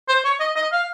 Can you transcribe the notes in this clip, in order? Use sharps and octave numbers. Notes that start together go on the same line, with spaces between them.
C5
C#5
D#5
D#5
F5